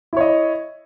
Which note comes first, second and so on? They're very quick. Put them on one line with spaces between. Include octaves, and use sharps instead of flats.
E4 C#5 D#5